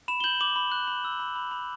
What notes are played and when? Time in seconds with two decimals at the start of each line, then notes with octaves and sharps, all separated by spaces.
0.08 B5 E7
0.20 G7
0.24 G6 F#7
0.41 D6 F#7
0.56 B5
0.72 F#6
0.87 B5
1.04 E6
1.20 B5
1.36 B5
1.51 B5